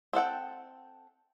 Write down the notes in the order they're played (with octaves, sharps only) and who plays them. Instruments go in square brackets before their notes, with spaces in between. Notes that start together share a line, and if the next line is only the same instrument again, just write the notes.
[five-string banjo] C4 A4 F#5 G5